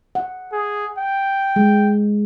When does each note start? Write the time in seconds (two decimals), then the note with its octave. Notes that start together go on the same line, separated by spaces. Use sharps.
0.15 F#5
0.53 G#4
0.98 G5
1.56 G#3